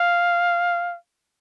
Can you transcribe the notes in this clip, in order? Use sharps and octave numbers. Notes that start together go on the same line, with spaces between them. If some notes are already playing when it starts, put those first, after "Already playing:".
Already playing: F5